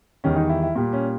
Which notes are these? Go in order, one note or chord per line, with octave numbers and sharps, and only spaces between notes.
E2 D#3 G3 C#4
D#4
E4
E4
A#2 G3
C#4